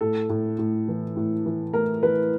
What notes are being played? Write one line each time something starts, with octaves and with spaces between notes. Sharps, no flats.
A2 A4
A2
A2
E3
A2
E3
A3 A#4
E3 B4